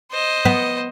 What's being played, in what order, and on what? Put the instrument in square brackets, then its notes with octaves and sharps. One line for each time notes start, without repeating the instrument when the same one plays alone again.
[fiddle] C5 D#5
[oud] B3